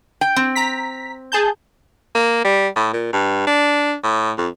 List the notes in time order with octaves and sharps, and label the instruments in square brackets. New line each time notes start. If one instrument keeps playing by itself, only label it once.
[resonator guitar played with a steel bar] G5
C4
[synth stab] A#5 B6
G#4 A5 G6
[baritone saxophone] A#3
G3
A2
A#2
G2
D4
A2
F2